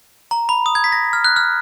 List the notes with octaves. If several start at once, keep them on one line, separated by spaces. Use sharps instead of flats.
A#5
B5
D#6
G#6
B6
A#6
F6
F#6
F6